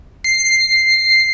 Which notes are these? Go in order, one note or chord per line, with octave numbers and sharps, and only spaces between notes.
C7